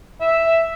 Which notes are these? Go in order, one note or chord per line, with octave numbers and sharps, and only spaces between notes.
E5